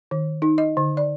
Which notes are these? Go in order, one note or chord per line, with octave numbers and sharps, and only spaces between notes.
D#3
D#4
D#5
D3
D5